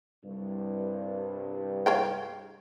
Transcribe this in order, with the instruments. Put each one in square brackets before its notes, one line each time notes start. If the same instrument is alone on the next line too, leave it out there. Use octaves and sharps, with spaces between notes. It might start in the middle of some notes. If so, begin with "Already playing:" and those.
[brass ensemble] C2 G2
[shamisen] C#5 F5 G5